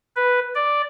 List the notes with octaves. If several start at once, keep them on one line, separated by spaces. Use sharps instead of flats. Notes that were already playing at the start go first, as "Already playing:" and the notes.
B4
D5